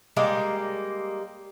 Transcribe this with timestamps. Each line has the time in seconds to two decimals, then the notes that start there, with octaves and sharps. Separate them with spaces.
0.16 G3 G#3 A#3